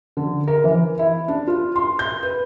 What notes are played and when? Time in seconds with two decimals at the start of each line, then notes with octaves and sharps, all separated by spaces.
0.17 D3
0.48 A#4
0.64 E3
0.99 E4
1.28 D4
1.47 F4
1.76 C6
1.99 G6
2.23 B4